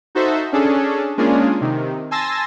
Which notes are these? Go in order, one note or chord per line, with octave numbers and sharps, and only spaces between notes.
D#4 F#4 A4 C5 E5
C#4 D4 G#4 A4
G#3 A#3 C#4 D4 F4 G#4
C3 D#3
G#5 A5 C6 E6 A6 A#6